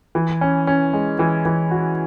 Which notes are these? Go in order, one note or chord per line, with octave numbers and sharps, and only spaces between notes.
E3
C#4
C#4
G#3
E3
E3
F#4